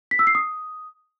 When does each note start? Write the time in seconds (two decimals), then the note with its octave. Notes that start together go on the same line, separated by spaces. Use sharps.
0.11 B6
0.19 E6
0.27 C7
0.35 D#6